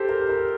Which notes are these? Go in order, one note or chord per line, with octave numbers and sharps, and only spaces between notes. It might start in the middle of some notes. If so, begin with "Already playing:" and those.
Already playing: G4 A4 C5
A#4
A#4